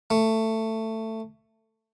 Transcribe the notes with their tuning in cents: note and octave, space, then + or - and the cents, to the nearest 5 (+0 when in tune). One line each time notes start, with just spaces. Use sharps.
A3 +15